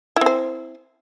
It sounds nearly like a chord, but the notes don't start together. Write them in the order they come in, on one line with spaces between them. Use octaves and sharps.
E4 C4 C5